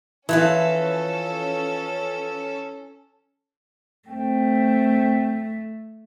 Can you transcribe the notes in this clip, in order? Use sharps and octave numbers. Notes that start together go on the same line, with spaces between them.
E3 F3 C#4 A4 B4 F5
A3 C4 G5